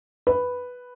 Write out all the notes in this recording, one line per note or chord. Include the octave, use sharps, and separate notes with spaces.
B4